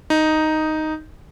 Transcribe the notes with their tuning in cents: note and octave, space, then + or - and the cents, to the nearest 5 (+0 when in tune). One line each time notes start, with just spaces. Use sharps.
D#4 +0